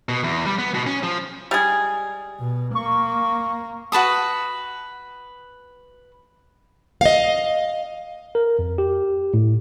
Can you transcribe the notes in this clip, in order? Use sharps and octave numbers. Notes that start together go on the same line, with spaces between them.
B2
E2
G3
B3
B2
C#4
F3
G3 G#3 G#4
B2
A#3 C#6
F#4 B4 A5 D#6
D#5 F5
A#4
F2
G4
A2